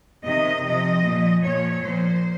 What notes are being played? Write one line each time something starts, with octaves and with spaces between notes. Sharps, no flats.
C3 D#3 D#5
C3 F3 D#5
A#2 F3
A#2 F3 C#5
A#2 F3 C5